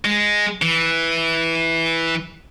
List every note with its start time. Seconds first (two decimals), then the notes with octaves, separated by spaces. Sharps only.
0.05 G#3
0.62 E3